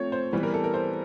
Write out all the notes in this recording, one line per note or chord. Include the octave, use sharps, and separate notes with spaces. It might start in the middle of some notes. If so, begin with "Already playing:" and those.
Already playing: F3 A3 C4 C#5
C5
E3 G3 B3 B4
A#4
A4
A#4
C5